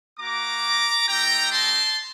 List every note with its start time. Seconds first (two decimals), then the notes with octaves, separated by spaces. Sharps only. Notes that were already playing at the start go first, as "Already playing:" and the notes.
0.20 A#3 F#4 A#5 D6
1.08 A3 D#4 G4 G5 A#5
1.52 A5 C6